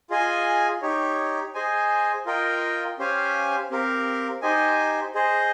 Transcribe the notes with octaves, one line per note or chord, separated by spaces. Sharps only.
F4 G#4 D#5 G#5
D#4 G4 C#5
G#4 C5 D#5 G#5
F4 A#4 D#5 G5
C#4 G4 C5 F5 G#5
C4 G4 A#4 F5
D#4 G4 C5 D#5 G#5
G#4 C5 D#5